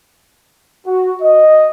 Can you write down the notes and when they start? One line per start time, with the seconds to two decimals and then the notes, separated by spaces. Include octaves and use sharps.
0.87 F#4
1.22 D#5